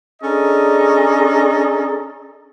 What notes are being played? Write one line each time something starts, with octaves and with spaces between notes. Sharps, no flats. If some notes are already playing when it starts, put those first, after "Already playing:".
C#4 D4 G#4 A4 D#5 A#5